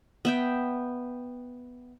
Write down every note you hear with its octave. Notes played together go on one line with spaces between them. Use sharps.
B3 E5 G5